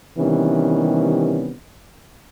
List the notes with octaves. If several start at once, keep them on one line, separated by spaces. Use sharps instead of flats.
C3 D#3 E3 G3 B3 C#4